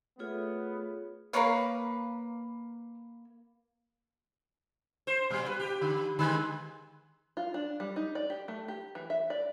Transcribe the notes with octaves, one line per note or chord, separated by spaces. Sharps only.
A3 B3 F4 G#4 C#5
A#3 A#4 B4 C#5 F5
C5
A#2 G3
B4
G4
D3
D3 D#3 G#3
F4
D4
G3
D#4
D5
G4
A3
G4
E3
E5
D5